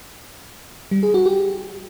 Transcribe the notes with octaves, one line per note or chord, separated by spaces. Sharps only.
G3
G#4
F#4
G4